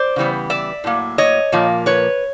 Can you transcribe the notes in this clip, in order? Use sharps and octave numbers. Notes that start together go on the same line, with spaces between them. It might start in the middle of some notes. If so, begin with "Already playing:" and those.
Already playing: C5 D5
C#3 E3 G3 B3
D5 E5
A2 F#3 A#3
C#5 D#5
A#2 F3 A#3
B4 C#5